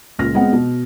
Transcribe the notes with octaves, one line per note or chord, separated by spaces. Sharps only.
C#2 A#2 F4 F6 A#6
G#3 B3 C4 F#5
B2